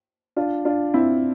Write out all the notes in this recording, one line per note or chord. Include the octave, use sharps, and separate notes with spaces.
D4 F4
D4 F4
C4 E4